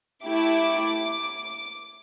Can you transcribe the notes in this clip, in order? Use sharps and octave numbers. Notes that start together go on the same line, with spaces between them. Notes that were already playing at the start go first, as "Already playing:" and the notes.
A3 E4 G4 D6